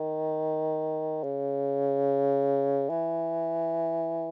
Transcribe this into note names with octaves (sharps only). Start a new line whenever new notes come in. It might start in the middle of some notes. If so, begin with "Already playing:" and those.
Already playing: D#3
C#3
E3